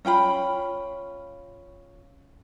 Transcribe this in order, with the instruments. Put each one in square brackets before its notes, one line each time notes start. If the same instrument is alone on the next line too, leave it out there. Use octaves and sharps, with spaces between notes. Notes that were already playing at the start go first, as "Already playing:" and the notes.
[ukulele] C#4 F4 G5 B5